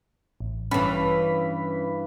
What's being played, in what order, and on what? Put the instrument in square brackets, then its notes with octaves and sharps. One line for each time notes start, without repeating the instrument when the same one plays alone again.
[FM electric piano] A1
[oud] G2 E3 [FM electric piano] C#4 B5 B6